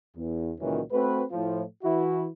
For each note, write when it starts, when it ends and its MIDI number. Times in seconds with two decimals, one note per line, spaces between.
0.15 0.52 40
0.60 0.81 37
0.60 0.81 46
0.60 0.81 51
0.60 0.81 52
0.60 0.81 54
0.60 0.81 61
0.92 1.23 57
0.92 1.23 60
0.92 1.23 66
0.92 1.23 71
1.32 1.63 45
1.32 1.63 53
1.84 2.27 52
1.84 2.27 64
1.84 2.27 66